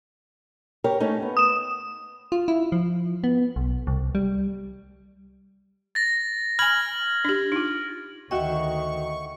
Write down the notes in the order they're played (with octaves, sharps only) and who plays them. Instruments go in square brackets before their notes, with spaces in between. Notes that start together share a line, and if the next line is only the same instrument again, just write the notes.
[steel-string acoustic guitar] G4 A#4 C#5
A3 C#4 D#4
B3
[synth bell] D#6 E7
[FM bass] F4
E4
F3
B3
B1
C2
G3
[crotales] A6 A#6
[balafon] G#5 B5 [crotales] F6 G#6 F#7
[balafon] D4 G4
D#4 F4
[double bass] D2 D#3 [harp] F#4 E5 G5 [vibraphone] D#5 F#5 [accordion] C#6